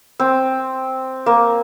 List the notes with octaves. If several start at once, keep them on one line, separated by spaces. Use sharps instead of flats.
C4
A#3